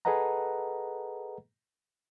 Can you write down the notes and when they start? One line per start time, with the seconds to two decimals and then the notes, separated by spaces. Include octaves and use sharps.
0.05 G#4 A4 B4 D#5 F#5 A#5